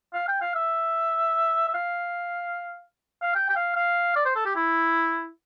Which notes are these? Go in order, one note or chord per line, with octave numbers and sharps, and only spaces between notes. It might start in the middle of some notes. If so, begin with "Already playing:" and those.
F5
G5
F5
E5
E5
F5
F5
G5
G5
F5
F5
D5
C5
A4
G4
E4